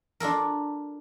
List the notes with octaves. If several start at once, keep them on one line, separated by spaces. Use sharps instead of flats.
D4 F4 A4 A#4